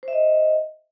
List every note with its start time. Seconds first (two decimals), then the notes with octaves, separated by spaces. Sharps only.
0.03 C5
0.08 E5
0.13 D#5